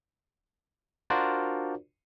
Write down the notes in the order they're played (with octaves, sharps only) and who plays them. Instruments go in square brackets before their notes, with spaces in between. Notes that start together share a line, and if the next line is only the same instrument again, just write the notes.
[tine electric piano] D4 F4 F#4 A#4 C5 D5